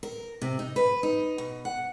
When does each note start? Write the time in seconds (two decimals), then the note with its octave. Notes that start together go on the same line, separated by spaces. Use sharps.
0.03 A#4
0.42 C3
0.59 D#4
0.76 B4
1.03 D#4
1.38 B2
1.65 F#5